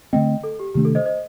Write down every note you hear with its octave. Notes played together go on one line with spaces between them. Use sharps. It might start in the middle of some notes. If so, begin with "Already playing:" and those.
D3 A3 C4 D#5 G5
A4
G4
C3 D#3 A3 D4 G4
A4
C5 D#5
C5 D#5